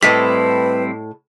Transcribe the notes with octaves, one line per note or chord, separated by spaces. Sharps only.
A2 G3 C4 E4 A4 B4 D#5 B6